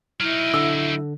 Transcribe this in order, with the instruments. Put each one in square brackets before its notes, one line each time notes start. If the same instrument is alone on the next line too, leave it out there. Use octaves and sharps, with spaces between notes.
[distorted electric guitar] F#3 D#4 [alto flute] E4 [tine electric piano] F6
[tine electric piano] D3 [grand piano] E6